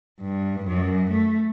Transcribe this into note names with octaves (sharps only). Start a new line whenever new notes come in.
G2
F#2
A3